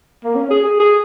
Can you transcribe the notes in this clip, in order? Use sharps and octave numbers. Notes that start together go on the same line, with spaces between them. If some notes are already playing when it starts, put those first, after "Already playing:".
A#3
C#4
G#4
G#4
G#4